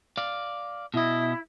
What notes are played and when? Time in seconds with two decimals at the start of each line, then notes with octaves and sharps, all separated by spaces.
0.17 D5 F5
0.94 B2 E4 D#5